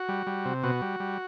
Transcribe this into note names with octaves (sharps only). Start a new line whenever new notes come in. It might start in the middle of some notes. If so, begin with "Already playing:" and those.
Already playing: F#4
G3
G3
C3
B2 F#4
G3
G3